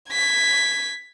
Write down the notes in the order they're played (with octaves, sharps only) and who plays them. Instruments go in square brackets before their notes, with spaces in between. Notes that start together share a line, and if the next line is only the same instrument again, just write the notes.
[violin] G#6 B6